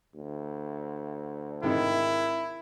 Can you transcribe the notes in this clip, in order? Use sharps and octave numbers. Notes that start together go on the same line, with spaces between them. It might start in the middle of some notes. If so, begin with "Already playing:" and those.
D2
G#2 C3 D#3 E4